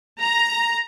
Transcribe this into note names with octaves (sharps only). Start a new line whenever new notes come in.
A#5